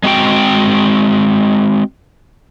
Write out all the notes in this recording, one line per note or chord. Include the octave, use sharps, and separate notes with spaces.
G#3 C4 F#4 G5